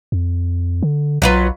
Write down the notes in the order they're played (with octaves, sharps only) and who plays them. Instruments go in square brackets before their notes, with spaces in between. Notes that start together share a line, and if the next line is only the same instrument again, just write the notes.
[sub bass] F2
D3
[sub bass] B1 [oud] F#3 F4 B4